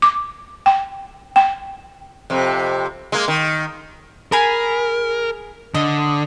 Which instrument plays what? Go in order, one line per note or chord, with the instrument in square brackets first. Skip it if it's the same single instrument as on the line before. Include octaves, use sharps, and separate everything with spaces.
[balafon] D6
G5
G5
[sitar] F2 C3
G#3 A#3
D#3
[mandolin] G#4 G#5 B5 [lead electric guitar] A#4
[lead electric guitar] D3 [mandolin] D#5